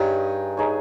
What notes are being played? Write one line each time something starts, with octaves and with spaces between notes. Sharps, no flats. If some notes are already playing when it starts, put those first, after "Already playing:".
Already playing: G2 D#4 G#4 C#5
D#4 G#4 C#5